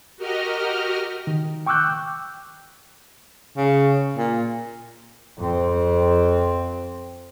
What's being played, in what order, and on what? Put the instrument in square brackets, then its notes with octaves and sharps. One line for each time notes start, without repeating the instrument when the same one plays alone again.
[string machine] F#4 G4 A#4 D#5 F6
[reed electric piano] D#3
G5 C#6 D6 E6 F#6 G6
[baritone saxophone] C#3
A#2
[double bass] F2 C4